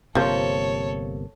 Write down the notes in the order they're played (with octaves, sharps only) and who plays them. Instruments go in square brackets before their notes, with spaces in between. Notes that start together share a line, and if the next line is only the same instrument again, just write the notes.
[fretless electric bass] G1 C3 A#3 [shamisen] F3 C5 [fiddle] A4 C#5